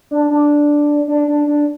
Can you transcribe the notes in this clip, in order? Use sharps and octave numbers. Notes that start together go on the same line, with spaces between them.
D4
D4
D4
D4
D4